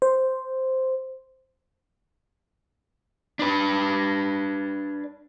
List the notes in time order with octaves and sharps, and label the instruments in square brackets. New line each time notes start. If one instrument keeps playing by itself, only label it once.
[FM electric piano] C5
[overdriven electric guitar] D4 B4